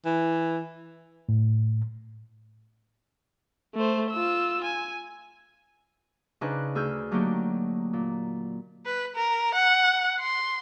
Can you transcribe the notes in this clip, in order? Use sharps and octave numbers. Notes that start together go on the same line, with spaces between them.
E3
A2
A3 C5
F4 E6
G#5
C#3 D4 D#4 B4 C5 F#6
D2 G#4 E6 F6 G6
D3 F#3 A3 A#3 D#4 G4
A#2
B4
A#4
F#5
C6